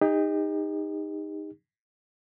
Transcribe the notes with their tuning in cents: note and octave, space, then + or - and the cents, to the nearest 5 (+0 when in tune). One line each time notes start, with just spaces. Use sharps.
D#4 +0 G4 +45